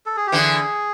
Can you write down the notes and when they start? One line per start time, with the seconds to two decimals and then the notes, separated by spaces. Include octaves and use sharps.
0.06 A4
0.16 G#4
0.27 G4
0.32 D3 E3 G#4